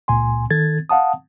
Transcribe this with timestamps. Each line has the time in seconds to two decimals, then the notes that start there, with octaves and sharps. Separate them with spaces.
0.08 C#2 A#2 G#5 C6
0.50 D#3 A4 G#6 A6
0.89 F5 F#5 A5 D#6